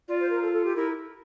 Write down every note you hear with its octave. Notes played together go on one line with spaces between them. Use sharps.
F4 D5
C5
A#4
A4
A4
G4
E4 A#4